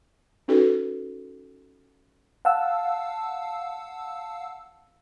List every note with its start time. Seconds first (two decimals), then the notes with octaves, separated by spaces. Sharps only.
0.48 C#4 D#4 F#4 A4 B4
2.45 F5 F#5 A5 E6